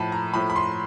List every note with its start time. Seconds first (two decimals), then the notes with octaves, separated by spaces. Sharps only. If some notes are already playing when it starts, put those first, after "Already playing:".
Already playing: A2 F3 A5 B5
0.12 A#5
0.34 A2 F3 B5
0.50 B5
0.56 C6